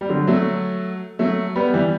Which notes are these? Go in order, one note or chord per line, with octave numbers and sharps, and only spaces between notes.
G3
D3 F#3
F#3 A3
F#3 A3
G3 B3
E3 G3